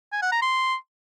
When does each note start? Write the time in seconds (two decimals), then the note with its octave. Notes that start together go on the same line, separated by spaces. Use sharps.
0.12 G#5
0.22 F#5
0.32 A#5
0.42 C6